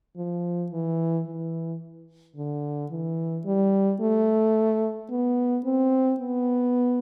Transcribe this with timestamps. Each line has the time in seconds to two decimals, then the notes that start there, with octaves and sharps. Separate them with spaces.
0.17 F3
0.72 E3
1.27 E3
2.37 D3
2.91 E3
3.45 G3
4.01 A3
5.10 B3
5.65 C4
6.20 B3